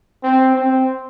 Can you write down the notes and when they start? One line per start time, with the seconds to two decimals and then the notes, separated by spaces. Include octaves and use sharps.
0.23 C4
0.55 C4